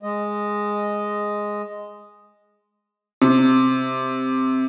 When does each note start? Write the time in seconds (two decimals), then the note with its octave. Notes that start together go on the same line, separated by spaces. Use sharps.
0.03 G#3 D#5
3.22 C3